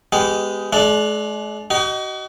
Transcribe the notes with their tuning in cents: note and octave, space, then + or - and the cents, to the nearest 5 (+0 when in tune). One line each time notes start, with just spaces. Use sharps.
G#3 +0 B3 +20 G4 -15
G#3 +45 D4 +0
D#4 +0 F#4 +40